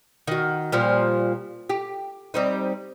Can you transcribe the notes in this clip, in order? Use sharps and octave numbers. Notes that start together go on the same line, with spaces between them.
D#3 F#4
A#2 F3 G3
G4
G3 C4 D#4